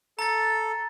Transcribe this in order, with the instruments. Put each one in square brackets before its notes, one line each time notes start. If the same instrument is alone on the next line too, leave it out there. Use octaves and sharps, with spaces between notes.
[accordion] A4 [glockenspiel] A#5 A6